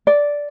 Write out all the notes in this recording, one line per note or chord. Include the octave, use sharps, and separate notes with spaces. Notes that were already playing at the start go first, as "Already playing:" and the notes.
D5